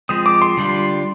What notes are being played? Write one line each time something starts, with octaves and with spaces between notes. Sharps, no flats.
F3 G#3 C4 D#6
D6
C6
D3 G3 D4 F4